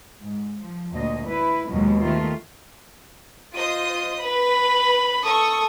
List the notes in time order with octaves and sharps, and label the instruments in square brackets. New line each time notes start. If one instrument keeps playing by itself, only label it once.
[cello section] G#2
F3
D2 A#2 D#5
E4 B4
D#2 B2 F3 F#3 G#3
D#3 A3 F4
[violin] F4 [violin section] C5 D#5 D#6
[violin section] B4 [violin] B5
[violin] A4 D#6 [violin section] C#6